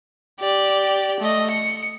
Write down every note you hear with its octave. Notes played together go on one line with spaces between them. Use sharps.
G4 D5
A3 D#5
C#7